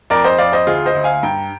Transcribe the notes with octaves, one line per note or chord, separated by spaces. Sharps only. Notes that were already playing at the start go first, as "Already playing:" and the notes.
F2 A#4 D5
C5 D#5
F2 D5 F5
C5 D#5
D2 F4 G#4
C5 D#5
D2
F5 G#5
G2 G5 A#5